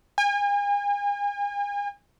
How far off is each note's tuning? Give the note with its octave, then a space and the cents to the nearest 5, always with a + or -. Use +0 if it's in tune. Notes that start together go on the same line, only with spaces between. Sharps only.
G#5 -40